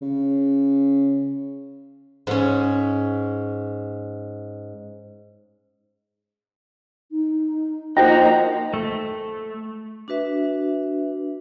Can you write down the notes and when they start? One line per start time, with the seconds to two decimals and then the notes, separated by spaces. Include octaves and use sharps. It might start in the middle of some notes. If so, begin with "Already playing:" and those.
0.02 C#3
2.27 G#2 C#4
7.11 D#4
7.97 F3 A#3 D#4 F#4 C5 G5 A#5
8.74 A3
10.08 D4 F#4 B4 E5